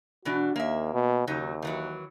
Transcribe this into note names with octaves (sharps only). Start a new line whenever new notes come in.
B2 E3 D4 F#4
D#2 A#3 E5
B2
D#2 C#3 F#3 D#4
D#3 E3 F#3